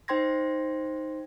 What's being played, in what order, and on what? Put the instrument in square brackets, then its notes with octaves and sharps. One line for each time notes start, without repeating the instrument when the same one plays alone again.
[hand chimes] D#4 C5 G5 C6 G#6 A#6